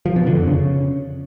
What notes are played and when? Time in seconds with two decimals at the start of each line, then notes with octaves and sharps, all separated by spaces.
0.06 F3
0.16 B2
0.26 D3
0.37 F2
0.47 C#3